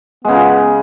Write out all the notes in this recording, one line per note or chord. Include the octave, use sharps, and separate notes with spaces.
C#3 G#3 B3